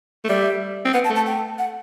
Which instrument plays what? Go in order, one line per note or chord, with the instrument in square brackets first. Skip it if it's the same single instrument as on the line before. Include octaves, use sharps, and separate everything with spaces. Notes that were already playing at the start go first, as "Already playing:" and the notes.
[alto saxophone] A3
[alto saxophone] G3 [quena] E5
[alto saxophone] C4
[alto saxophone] B3 [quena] F#5
[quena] A5
[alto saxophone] A3
[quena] A5
G5
F#5